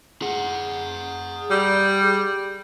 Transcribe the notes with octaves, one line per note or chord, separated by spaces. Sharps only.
G#4 F#5
G3